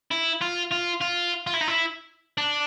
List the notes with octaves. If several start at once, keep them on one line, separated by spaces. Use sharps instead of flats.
E4
F4
F4
F4
F4
E4
D#4
E4
D4